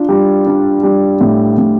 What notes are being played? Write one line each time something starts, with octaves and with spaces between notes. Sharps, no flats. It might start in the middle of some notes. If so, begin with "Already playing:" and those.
Already playing: D4 F4
G3
D4
G3
A2
A2